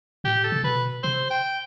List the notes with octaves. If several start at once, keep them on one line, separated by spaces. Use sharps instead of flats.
A2 G4
A4
C3
B2 B4
C3 C5
G5